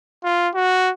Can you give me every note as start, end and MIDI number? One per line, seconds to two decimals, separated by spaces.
0.24 0.49 65
0.54 0.91 66